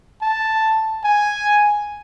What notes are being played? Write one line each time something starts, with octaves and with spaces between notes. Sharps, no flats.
A5
G#5